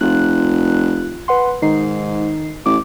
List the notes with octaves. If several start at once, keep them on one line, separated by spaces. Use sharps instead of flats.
F1 F4 F#6
B4 F#5 C6
G#2 D#3 D#4 C7
A1 D6